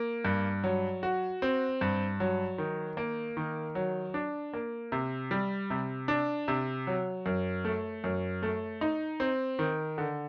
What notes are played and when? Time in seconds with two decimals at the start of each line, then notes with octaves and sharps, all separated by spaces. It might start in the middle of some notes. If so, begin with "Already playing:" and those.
Already playing: A#3
0.25 G2
0.64 F#3
1.03 F#4
1.42 C4
1.81 G2
2.20 F#3
2.58 D#3
2.97 A#3
3.37 D#3
3.75 F#3
4.14 D4
4.53 A#3
4.92 C3
5.31 G3
5.70 C3
6.08 D4
6.48 C3
6.87 F#3
7.26 F#2
7.65 A3
8.04 F#2
8.42 A3
8.81 D#4
9.20 C4
9.59 D#3
9.98 D3